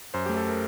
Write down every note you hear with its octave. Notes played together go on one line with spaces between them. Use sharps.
F#2 C5
A3 G4
A4
A#4